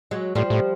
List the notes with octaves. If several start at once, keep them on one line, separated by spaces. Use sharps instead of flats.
F#3 G#3
A2 F3 G3
A2